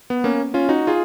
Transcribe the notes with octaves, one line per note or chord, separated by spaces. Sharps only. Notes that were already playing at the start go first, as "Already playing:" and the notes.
B3
A#3 C#4
C#4 F4
D#4 F#4
F4 G#4